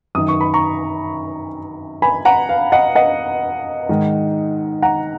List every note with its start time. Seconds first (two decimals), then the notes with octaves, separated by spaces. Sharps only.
0.15 F#2 D#3 D#6
0.28 C#6
0.41 B5
0.54 A#5 C#6
2.02 G#5 B5
2.25 F#5 A#5
2.49 F5
2.72 D#5 F#5
2.95 D#5 F#5
3.89 G#2 D#3
4.82 F#5 A#5